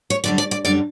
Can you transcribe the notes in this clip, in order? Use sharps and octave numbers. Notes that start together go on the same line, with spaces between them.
C#5
F#2 D3 G3 D5
D5
D5
F#2 D3 G3 D5